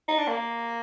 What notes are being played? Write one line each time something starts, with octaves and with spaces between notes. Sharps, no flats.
D#4
D4
A#3